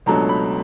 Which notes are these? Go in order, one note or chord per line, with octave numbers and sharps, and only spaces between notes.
C#2 B2 F#3 A3 D4 A#5
B5